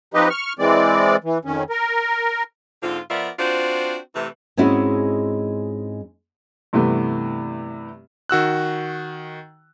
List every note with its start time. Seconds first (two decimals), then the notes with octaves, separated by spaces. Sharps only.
0.14 F3 C4 D#4 G4 B4 D#5
0.30 C#6 F6
0.59 E3 G#3 C4 D5
1.24 E3
1.45 F2 D#3 C#4
1.70 A#4
2.83 G#2 D3 C4 F4
3.09 F3 B3 F4 A#4 D5 E5
3.39 C4 D4 F4 F#4 C5
4.15 C3 E3 A3
4.57 G#2 G#3 C4 C#4 E4 F#4
6.73 G2 C3 E3 A3 B3
8.29 D#3 F#4 E6 F#6